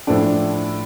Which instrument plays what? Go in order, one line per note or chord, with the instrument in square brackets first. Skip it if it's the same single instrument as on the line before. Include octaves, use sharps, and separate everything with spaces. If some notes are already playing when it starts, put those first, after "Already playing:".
[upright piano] A2 F3 A3 D4